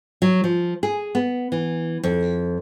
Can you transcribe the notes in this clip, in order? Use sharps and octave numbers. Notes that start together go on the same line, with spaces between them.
F#3
F3
G#4
B3
E3
F2